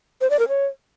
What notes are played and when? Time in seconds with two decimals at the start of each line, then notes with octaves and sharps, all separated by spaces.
0.21 C5
0.30 D5
0.39 A#4
0.48 C#5